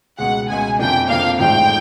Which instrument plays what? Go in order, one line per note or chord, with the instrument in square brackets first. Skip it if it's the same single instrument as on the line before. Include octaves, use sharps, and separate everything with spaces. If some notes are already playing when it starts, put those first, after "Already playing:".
[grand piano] C#2 B2 G#3 [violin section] F#5
[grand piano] C#2 B2 G#3 [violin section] G#5
[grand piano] F2 C3 F3 A#3 D4 [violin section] G5
[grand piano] F2 C3 F3 A#3 D4 [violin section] F5
[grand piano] A1 G#2 F3 A3 [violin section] G5